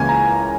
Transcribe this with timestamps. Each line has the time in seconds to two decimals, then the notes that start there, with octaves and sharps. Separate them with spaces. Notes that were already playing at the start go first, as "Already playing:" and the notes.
Already playing: C#2 C#3 E3 A#3 C#4 G#5
0.09 A#5